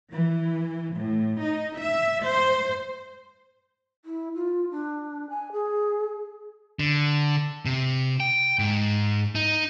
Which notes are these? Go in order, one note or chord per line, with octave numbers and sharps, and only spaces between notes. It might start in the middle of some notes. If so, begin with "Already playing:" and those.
E3
A2
D#4
E5
C5
E4
F4
D4
G#5
G#4
D3
C3
G5
G#2
D#4